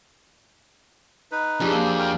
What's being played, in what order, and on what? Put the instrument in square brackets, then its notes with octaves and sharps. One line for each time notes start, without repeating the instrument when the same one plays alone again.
[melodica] D#4 B4
[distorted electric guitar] F2 [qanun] D4 G4 G#4
[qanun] A#3 C5 C6
[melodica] A#4 G5